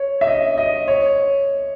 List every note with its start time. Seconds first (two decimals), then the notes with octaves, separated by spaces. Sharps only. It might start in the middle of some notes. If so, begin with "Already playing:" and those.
Already playing: C#5
0.21 E5
0.27 D#5
0.58 D#5
0.88 C#5